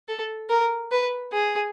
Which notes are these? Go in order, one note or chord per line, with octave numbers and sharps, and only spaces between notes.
A4
A#4
B4
G#4